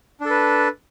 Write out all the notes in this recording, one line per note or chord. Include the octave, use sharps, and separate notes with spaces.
D4 A4 B4